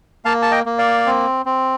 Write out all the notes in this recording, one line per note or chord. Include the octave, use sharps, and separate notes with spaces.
A#3 F5 A5
A5
D#5 G5
A#3
D5 F5
C4
C4